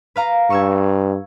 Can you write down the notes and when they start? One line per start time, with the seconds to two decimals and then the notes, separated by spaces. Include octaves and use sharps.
0.16 B4 F5 A#5
0.50 G2 C#6 E6 G#6